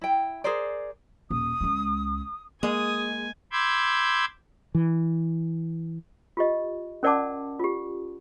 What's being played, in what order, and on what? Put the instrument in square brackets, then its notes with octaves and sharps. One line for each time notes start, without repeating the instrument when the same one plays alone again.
[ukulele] E4 G5
G#4 A#4 C5 D5
[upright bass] D#1 [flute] D#6
[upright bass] C#2 G#3
[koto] G#3 [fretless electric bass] A#3 [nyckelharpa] G#5 [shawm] D#6
[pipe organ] B5 C6 D6 E6 G6 G#6
[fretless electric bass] E3
[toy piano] F4 G4 D#5
C#4 A#4 D5 F#5 A5 D6
F4 G4